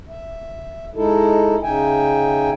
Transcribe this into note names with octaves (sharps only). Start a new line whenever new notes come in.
E5
G#3 D#4 E4 A4
C#3 D#4 E5 G5 G#5